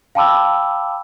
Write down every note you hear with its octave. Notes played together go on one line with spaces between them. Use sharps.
F5 G5 A5 B5 D6 E6